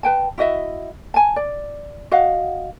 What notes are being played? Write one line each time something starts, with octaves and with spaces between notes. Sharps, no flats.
B4 G5 A5
E4 F#4 D#5 E5
G#5 A5
D5
F#4 D#5 F5 F#5